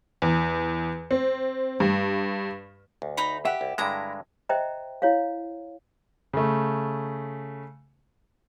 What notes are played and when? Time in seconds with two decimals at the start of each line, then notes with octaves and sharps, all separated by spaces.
0.22 E2
1.11 C4
1.80 G2
3.02 D2
3.17 D#4 A#5 B5
3.45 G4 E5 F#5
3.61 C2
3.78 G2 D3 G#3 E4 A#5
4.49 C5 D#5 E5 G5 A#5
5.02 E4 C#5 F5
6.33 C#3 A3